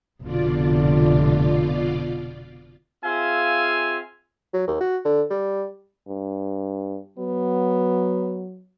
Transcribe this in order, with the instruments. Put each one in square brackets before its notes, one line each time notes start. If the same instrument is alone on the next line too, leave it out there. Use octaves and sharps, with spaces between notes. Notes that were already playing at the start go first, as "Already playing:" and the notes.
[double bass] F1 D3 [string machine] B2 F4 D5
[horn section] C4 F4 G#4 E5 F5 G#5
[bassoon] F#3
D#2
F#4
D3
G3
[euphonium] G2
[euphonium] F#3 [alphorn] B3